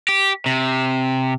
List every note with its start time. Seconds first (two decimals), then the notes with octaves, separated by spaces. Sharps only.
0.09 G4
0.46 C3